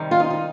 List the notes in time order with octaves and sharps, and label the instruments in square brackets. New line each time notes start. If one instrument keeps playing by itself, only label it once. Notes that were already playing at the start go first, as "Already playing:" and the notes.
Already playing: [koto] C3 D#3 G3
[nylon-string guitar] F4
D#4
D#4